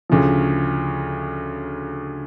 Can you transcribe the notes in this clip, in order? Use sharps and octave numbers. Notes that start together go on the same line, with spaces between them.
D2 C#3 F3